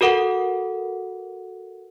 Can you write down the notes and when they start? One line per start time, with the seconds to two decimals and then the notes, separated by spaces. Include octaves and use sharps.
0.01 F#4 A4 A#4 F#5